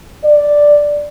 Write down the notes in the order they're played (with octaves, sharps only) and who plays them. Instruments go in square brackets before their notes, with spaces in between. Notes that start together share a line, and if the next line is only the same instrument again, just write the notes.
[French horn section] D5